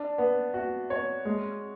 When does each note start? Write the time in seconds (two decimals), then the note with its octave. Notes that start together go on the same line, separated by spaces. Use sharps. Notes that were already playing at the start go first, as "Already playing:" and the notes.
Already playing: D4
0.18 B3
0.54 F#4
0.90 C#5
1.25 G#3